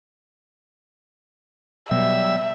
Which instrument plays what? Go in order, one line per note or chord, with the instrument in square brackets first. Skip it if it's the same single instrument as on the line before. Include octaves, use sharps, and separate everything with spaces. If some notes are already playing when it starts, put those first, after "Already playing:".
[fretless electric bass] B2 [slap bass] F#3 [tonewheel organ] G3 E6 [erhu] E5